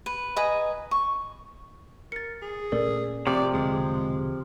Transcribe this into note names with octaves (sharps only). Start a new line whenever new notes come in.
B4
B4 D#5 G#5 A#5
C#6
A#4 A6 C#7
G#4
A#2 A3 C#4 A4 A#4 D5
C3 F3 C4 G4 D5
E1 D3 G#3